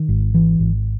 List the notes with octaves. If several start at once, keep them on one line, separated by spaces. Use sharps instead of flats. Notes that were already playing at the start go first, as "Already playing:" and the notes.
Already playing: D#3
G#1
E3
G#1